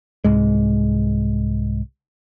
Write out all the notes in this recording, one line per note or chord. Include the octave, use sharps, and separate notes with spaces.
C2 G#2 G#3